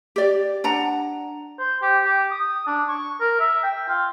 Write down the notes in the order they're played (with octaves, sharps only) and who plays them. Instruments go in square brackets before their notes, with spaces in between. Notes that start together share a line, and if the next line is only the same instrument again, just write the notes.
[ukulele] G4 D5
D4 F#5 A#5
[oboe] C5
G4
G4
D#6
D4
C#6
A#4
E5
G5
F4